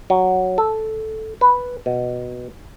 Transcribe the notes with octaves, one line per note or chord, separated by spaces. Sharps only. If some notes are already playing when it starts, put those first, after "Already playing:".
F#3
A4
B4
B2